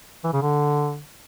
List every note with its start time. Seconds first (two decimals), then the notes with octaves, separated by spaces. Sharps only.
0.24 E3
0.33 C#3
0.42 D3